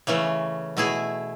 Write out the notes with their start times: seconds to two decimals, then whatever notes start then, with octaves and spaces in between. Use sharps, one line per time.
0.07 C#3 E3 A3 C#4
0.77 B2 A3 E4 G#4